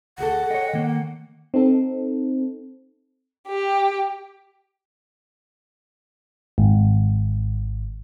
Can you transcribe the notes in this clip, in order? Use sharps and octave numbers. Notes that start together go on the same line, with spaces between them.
D2 G#4 A4 F#5
C#5 D#5 G5
D#3 A#3
C4 D#4 A4
G4
G#1